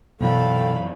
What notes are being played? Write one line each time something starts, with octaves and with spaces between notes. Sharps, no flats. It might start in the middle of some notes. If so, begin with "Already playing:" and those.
F#2 B2 E3 A4 F5 G5 B5